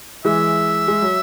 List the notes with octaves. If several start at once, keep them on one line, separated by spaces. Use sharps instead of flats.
E3 G#3 E5
G#3
F#3